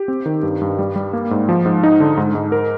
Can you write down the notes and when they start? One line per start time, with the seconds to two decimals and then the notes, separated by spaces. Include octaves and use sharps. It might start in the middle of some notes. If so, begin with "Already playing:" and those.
Already playing: G4
0.08 C4
0.26 D#3
0.43 G2
0.61 G2
0.79 G3
0.96 G3
1.13 A#3
1.31 G#2
1.49 F3
1.65 G#2
1.83 D#4
2.00 D3
2.17 G#2
2.35 G#2
2.52 A#4